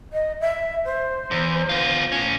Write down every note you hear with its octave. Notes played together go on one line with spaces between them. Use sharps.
D#5
E5
C5
E2
B3 F4
A2 C#4